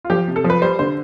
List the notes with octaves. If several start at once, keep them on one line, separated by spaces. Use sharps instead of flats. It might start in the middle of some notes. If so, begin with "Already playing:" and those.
F4
F3 G4
C3
A4
F3
B4
G3 C5
D3 C5